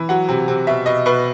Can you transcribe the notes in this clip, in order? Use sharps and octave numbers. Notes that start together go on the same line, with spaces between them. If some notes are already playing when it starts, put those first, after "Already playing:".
Already playing: E3
F#3 F#5
C3
C3
B2 E5
B2 D#5
B2 B4